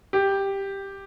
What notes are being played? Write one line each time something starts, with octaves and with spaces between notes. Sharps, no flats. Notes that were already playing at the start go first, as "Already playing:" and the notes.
G4